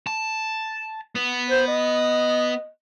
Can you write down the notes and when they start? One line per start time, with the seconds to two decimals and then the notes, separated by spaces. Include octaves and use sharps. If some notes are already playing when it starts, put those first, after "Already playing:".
0.07 A5
1.15 B3
1.51 C5
1.68 D#5